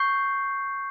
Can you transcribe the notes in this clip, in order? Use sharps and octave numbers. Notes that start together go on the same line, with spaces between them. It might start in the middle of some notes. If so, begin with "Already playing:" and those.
Already playing: C#6 G6 C7